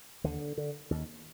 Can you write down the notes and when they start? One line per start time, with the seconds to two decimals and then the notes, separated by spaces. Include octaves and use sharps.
0.24 D#2 D3
0.58 D3
0.91 D#2